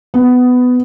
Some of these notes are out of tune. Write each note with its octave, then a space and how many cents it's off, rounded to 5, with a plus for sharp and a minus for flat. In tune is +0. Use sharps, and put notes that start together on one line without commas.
B3 +15